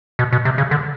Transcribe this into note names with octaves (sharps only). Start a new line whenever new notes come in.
B2
B2
C3
C#3
D3